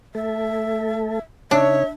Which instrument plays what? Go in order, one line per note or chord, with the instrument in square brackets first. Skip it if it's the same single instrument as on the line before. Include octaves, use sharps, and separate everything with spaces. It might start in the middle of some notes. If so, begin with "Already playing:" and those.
[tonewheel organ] A3 A4 [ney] E5
[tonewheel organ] C#3 D#4 [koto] D4 [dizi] C#5 [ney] E5